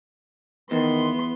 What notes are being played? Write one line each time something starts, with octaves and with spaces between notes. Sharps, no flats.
E2 D#3 B3 C6